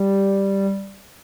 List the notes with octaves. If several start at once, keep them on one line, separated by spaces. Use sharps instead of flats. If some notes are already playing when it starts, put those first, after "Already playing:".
Already playing: G3